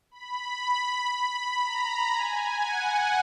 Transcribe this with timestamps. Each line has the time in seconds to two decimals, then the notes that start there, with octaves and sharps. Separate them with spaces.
0.11 B5
1.11 B5
1.62 A#5
2.12 G#5
2.62 F#5